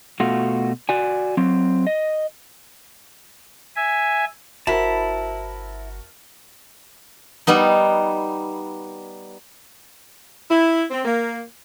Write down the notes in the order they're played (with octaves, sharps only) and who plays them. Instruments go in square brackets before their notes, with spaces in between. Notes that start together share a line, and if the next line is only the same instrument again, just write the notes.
[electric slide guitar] B2 A3 F4 F#4
F#4 D5 G#5
F#3 C4
D#5
[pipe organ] E5 G#5
[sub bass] G1 [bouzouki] E4 [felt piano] F#4 A#4 C5 [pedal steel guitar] A5 B5
[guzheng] G3 B3 D#4
[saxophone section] E4
C4
A#3